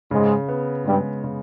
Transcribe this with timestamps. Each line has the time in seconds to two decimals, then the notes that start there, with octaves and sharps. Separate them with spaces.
0.11 G#2 C#3 G#3
0.49 B3
0.86 G2 G3 G#3
1.24 C#3